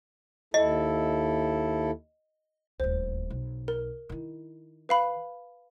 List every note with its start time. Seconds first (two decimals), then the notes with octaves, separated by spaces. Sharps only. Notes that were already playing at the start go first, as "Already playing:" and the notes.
0.54 D#2 E4 A4 D#5
2.80 D#1 D2 C5
3.30 B1
3.68 A#4
4.09 D#3 E4
4.89 B4 F5 B5